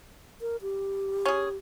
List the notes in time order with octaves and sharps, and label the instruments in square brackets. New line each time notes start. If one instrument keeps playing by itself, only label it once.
[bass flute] A#4
G4
[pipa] C#4 G#4